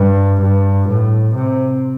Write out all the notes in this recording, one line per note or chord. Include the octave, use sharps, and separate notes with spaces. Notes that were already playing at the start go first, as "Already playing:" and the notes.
Already playing: G2
G2
A2
C3